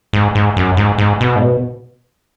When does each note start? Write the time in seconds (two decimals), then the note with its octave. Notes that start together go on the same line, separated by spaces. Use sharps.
0.13 G#2
0.35 G#2
0.57 F#2
0.77 G#2
0.98 G#2
1.21 B2
1.36 G#2
1.42 B2